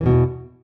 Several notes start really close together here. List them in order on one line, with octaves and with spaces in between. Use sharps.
E3 D3 B2 G2 E2